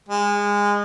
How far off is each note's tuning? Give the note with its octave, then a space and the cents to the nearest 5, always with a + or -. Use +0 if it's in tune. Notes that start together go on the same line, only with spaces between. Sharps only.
G#3 -25